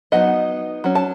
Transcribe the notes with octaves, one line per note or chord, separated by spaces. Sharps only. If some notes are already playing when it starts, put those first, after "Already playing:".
F#3 B3 D#4 D#5 F#5
F#3 C#4
A5